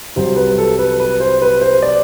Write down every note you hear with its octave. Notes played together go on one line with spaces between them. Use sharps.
C2 C3 F#3 C5
B4
A4
B4
B4
C5
B4
C5
D5